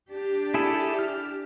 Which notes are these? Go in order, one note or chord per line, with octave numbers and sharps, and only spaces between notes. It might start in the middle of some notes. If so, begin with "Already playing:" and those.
D4 G4
E4 G#4 A4
F6